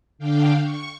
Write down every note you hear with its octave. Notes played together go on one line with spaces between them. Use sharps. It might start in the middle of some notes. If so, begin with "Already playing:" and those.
D3 D4 F5 G5
C#6